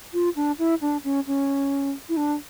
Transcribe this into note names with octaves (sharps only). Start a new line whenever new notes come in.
F4
D4
E4
D4
C#4
C#4
E4
D4